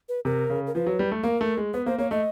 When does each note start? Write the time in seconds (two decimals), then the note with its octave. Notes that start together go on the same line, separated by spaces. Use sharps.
0.09 B4
0.25 C3 A#4
0.50 C#3
0.67 A#4
0.75 F3 B4
0.87 F#3
0.99 G3
1.11 A3
1.24 A#3 A#4
1.41 A3
1.57 G#3
1.74 B3 B4
1.86 A#3 C5
1.98 A#3 C#5
2.11 A3 D#5